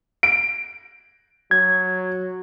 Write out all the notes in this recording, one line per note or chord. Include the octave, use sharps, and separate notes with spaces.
D7
F#3 G#6